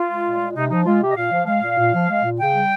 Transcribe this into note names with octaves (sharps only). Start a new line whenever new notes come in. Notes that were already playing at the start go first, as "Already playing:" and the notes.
Already playing: F4
G#3
A#2
G#3
C3 D#4
F3 D#4
G#3 F4
C3 G4
D#5
A#2 F5
F3
G#3 F5
A#2
A#2
F3
G#3
A#2
C#3 G5
G3